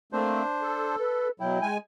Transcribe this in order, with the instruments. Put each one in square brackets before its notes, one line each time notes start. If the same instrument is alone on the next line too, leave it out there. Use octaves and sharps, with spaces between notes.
[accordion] A3 A#3 C4 [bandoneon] D4 C5
[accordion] A4
[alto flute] B4
[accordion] B2 F#3 [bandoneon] E4 [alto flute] G5
[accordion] G#3 G#5